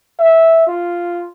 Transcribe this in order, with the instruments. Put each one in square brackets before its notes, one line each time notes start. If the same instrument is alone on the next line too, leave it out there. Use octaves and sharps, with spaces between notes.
[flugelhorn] E5
F4